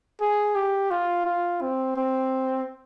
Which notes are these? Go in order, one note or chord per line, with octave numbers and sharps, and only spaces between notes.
G#4
G4
F4
F4
C4
C4